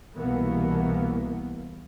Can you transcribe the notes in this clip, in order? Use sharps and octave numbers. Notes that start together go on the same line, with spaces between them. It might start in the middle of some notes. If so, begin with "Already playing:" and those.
C2 B2 E3 A#3 B3